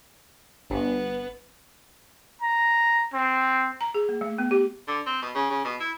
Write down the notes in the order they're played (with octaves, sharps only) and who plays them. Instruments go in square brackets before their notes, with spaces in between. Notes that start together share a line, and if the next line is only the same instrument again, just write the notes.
[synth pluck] G1 [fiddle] B3
[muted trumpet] A#5
C4
[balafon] A#5
G#4
A#3
A3
B3
G4
[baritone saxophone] D3
C4
B2
C#3
C#3
B2
E4